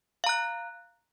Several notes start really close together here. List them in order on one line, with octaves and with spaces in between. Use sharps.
F5 A#5 F#6